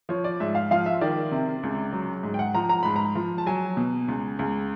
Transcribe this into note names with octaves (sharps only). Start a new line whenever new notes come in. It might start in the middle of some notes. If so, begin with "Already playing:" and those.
F3 C#5
D5
G#2 E5
F5
F3 F5
E5
D#3 D5
C3
C#2
F#3
G#2
G5
F#5
F3 A#5
A#5
G#2 B5
A#5
F3
A5
F#3 G#5
B2
C#2
C#2